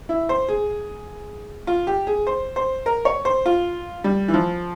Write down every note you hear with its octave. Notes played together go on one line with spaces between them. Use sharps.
E4
C5
G#4
F4
G4
G#4
C5
C5
A#4
C#5
C5
F4
G3
E3
F3